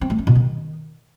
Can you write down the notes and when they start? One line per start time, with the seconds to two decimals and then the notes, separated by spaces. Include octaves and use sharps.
0.01 C4
0.10 A3
0.18 C#4
0.27 B2
0.35 D#3